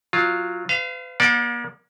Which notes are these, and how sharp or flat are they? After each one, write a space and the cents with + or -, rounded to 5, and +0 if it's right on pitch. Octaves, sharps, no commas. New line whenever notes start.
F#3 -10 F4 +0
B4 +40 F5 -20
A#3 +40 D5 +0 F#5 -40